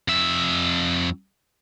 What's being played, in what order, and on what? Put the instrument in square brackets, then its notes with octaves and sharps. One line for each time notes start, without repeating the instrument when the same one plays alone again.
[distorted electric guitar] F2 E5